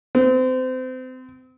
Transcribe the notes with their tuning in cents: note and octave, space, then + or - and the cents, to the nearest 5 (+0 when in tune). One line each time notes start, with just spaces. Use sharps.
C4 -30